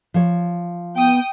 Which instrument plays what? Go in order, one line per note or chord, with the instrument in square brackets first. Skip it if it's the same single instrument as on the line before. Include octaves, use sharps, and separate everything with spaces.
[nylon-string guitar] F3 C#5
[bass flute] B3 [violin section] G5 D#6